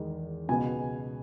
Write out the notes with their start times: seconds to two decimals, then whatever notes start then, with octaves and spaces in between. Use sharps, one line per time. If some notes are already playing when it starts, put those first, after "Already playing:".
Already playing: E2 D#3 G#3
0.48 C#2 B2 G#3 B3 G#5